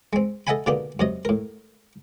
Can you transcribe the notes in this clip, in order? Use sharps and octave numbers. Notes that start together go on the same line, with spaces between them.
G#3 C4
A4 D#5 E5 F#5 G#5 B5
B2 D3 A#3 D4 D#4 G4
F#2 C3 D#5
A2 A#4